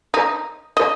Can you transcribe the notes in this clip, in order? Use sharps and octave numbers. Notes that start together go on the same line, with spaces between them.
D#4
D#5